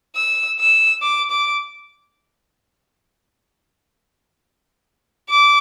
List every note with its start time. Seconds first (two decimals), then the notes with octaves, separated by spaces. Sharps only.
0.16 E6
0.60 E6
1.02 D6
1.31 D6
5.29 D6